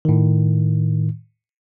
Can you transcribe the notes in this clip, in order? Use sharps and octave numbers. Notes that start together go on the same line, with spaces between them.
A2 D#3